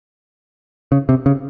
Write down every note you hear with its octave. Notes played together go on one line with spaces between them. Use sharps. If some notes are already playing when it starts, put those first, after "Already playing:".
C#3
C3
C#3